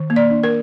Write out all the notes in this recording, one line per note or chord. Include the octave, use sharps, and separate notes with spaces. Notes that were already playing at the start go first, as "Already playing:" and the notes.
Already playing: D#3
A#3
D5
D4
A#4